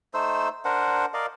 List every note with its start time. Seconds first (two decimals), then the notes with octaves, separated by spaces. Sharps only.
0.14 A3 D#4 C5 E6
0.65 D4 A#4 C5 F#5
1.14 A#4 D5 D#5 F5